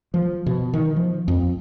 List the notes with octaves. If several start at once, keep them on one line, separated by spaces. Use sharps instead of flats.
F3
B2
D#3
F3
F2